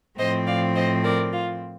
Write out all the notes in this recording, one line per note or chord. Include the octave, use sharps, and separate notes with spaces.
A2 F3 C4 C5 D#5
D5 F5
C5 D#5
A#4 D5
F4